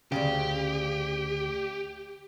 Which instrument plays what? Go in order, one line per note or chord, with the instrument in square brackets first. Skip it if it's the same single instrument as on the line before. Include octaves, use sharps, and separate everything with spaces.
[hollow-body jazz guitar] D2 A2 C#3 [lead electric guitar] G4